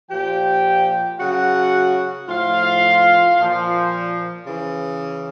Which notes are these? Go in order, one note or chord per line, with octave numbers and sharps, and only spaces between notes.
A#2 F3 G4 G5
C#3 F#3 F#4 F#5
A2 F3 F4 F5
A#2 F3
C#3 E3